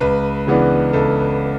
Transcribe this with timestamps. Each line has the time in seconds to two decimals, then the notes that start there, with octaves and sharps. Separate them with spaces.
0.01 C#2 B4
0.47 C#3 E3 B3 D4
0.93 C#2 A4